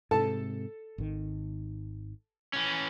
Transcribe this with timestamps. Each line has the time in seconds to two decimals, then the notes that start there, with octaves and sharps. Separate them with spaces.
0.11 G#2 C3 A4 A5
0.98 G#1 D#3
2.53 E3 C#4